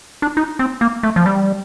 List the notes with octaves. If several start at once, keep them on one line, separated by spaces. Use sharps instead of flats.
D4
D#4
C4
A#3
A3
F3
G3